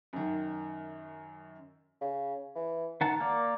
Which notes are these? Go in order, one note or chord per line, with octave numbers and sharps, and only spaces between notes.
F#2 D#3
C#3
E3
D#3 A#4 F#5 A5
A#3 D5